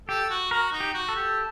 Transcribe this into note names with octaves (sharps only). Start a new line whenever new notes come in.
G4 A4
F#4
F#4 A#4
D#4
G4
F#4
A4
G4